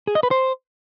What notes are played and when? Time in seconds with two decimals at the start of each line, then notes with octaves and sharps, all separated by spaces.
0.07 G#4
0.15 D#5
0.23 B4
0.31 C5